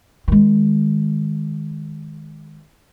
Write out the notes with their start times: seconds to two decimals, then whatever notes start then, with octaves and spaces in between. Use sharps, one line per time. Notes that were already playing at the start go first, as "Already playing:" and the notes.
0.28 D#3 G#3